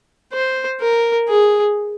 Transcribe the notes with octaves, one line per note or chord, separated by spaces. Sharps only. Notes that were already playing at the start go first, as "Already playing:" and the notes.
C5
A#4
G#4